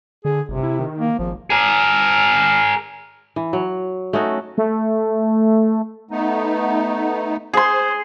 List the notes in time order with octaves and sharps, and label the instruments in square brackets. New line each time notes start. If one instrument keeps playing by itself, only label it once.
[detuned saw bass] D3 [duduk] G#4
[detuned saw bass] G1 [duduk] C3
[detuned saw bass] E4
D#3
[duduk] A#3
[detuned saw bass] G#1 [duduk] F3
[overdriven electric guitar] G#4 A#4
[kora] E3
F#3
A3 C#4 D#4 F#4
[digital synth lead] A3
[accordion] A3 B3 D#4
[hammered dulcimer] G#4 C6 [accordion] C5